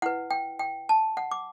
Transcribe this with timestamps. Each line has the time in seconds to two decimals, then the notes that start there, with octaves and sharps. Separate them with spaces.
0.02 E4 B4 F#5
0.31 G5
0.59 G5
0.89 A5
1.17 F#5
1.31 D6